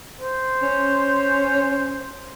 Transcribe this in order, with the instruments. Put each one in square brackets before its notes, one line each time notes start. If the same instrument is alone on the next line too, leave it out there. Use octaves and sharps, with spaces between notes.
[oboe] C5
[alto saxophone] C#4